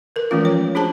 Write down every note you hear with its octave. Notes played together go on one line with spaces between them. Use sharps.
A#4 B4
E3 F3 G#3 A3 C#4 F4
C#5
D4 F#4 G#4 C5 A5 A#5